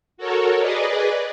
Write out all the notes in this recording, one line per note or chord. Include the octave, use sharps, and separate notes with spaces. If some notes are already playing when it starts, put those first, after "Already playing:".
F#4 A4 A#4 C#5
G#4 B4 D5 D#5